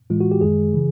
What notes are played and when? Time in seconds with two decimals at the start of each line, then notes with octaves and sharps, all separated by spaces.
0.10 A2 E3 G#3 F4
0.20 F#4
0.32 G4
0.41 F#2 D#3 G#3 G#4
0.73 C#3 E3